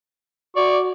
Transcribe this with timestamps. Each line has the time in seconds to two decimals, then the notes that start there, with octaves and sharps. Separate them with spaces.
0.56 F#4 D5 C#6